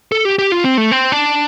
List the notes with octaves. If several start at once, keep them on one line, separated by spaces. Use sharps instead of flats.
A4
G4
G4
F4
C4
A3
C4
D4